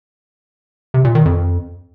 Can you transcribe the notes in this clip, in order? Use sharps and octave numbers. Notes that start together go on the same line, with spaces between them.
C3
A#2
D#3
F2